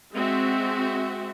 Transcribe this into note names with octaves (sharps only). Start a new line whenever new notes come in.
G#3 C4 F#4 E5